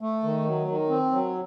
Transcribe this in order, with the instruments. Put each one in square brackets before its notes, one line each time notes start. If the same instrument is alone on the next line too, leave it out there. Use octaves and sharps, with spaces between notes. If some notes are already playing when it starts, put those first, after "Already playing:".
[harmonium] A3
D#3
F#3
D#3
C4
F#3